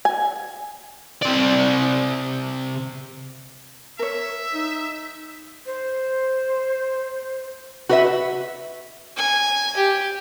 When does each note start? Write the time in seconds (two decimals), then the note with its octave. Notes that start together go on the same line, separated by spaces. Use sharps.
0.05 G#5
1.22 C3 D5
3.99 A#4 C#5 E5
4.54 D#4
5.66 C5
7.89 F#4 B4 E5
9.17 G#5
9.77 G4